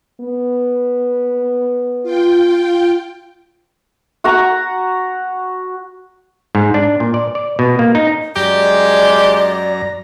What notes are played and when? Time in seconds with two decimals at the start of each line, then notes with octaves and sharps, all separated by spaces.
0.21 B3
2.03 F4 G5
4.24 F#4 F#5 A#5 C#6
6.55 G#2
6.74 D4
7.00 A#2
7.14 D5
7.35 D5
7.59 B2
7.79 A#3
7.95 D#4
8.36 F#2 G#3 G4 D5 A#5